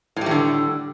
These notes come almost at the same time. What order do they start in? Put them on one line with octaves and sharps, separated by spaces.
A2 G3 E3 D3